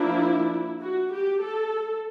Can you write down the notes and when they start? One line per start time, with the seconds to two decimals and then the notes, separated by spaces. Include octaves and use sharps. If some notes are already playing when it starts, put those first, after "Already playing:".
Already playing: F3 A#3 D4 E4
0.81 F#4
1.12 G4
1.42 A4